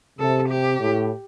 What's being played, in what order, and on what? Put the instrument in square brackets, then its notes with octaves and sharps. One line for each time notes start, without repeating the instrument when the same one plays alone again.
[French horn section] C3 [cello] A4
[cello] G4
[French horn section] A2